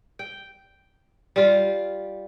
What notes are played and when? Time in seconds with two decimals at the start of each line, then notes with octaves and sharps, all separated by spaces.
0.19 G5
1.36 G3 F4